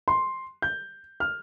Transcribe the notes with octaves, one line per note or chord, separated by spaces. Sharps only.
C6
G6
F6